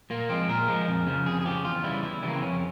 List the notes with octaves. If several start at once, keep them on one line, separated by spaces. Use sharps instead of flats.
A#2 A#3
F3 G#3 C4
A#2 A#4
F3 G#3
F2
C#3 F3
F2 G#4
G#4
C#3 F3 G4
E2 F4
C#3 E3 G3 E4
E2 E4
C#3 E3 G3
A#3
C4
F2 C#4